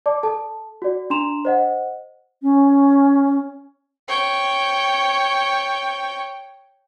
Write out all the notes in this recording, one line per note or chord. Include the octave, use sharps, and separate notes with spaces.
D5 A5 D6
A4 A5
F#4 D5
D4 A#5 C6 E7 F7
C5 D#5 F#5
C#4
C#5 G5